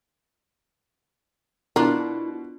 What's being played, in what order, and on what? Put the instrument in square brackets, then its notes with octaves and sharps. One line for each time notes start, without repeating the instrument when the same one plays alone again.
[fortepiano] B2 [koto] D4 F4 [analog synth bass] E4 [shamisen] A#4